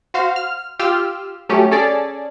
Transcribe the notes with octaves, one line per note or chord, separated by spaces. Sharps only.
F#4 C5 F5
F6
F4 G4 E6 F6
F#3 A3 C#4 G4
C#4 G#4 A4 D5